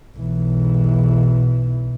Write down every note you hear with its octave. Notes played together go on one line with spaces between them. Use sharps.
B1 E3